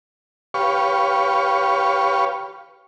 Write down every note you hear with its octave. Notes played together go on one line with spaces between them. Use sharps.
G4 B4 C#5 F5 C#6